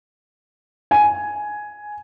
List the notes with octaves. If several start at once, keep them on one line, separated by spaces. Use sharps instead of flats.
G#5